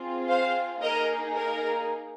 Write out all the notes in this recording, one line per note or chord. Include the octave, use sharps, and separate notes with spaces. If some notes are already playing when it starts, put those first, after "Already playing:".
Already playing: C4 F4 G#4
C5 F5
A#3 D#4 G#4 A#4 D#5
A#4